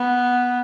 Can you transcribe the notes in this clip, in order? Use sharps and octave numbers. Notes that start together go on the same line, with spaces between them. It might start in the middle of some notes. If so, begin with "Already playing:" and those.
Already playing: B3